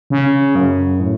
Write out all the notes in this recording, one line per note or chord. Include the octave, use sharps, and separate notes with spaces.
C#3
F#2
A2